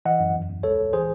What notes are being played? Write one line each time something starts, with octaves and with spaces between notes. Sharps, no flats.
E3 D#5 F#5
F#2
E2
E2
C#2 A4 C#5
C#2
E3 G#4 C5